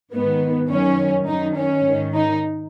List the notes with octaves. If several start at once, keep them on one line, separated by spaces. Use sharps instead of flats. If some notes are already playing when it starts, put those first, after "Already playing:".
G#2 D#3 B3
F#2 D#3 C#4
F#2 D#3 D#4
C#4
G#2 D#3
D#4